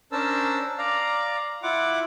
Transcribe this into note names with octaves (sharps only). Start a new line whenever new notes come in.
C#4 D4 A#4 C5 A5 E6
D5 F5 A#5
E4 F4 F#5 D6